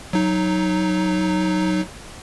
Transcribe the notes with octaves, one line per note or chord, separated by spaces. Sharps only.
F#3 D#4